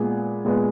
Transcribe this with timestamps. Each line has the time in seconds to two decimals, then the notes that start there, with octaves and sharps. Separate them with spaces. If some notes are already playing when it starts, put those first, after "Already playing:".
Already playing: A#2 G#3 B3 G#4
0.45 A#2 G#3 B3